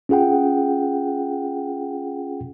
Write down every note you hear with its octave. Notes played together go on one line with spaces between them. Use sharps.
C#4 F4 G#4 F#5 G5